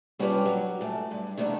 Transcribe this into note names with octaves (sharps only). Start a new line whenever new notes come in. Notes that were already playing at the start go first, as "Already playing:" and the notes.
G3 C#4 D4 F4 B4 D5
F#3
F#2 A3
G2
C3 D#3 A3 B3 D4